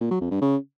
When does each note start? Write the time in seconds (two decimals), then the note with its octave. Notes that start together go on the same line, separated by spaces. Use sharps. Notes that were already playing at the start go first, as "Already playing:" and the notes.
0.01 A#2
0.11 F#3
0.21 F2
0.31 G2
0.41 C#3